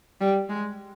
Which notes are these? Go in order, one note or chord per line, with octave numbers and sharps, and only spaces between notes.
G3
G#3